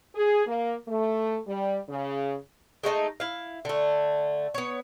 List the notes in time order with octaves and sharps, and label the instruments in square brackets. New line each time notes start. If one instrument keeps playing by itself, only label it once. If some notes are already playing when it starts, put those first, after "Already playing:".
[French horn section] G#4
A#3
A3
G3
C#3
[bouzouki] G#3 A3 D#4 A5
E4 F5
D3 A3
B3 C#5